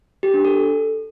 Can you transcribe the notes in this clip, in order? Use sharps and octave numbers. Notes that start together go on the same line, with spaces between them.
G4
D4
A4